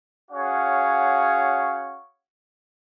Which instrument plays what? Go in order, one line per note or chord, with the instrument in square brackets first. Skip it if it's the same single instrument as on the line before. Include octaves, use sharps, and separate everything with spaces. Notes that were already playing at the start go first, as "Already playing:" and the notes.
[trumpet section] C#4 F#4 G#4 C#5 F5 F#5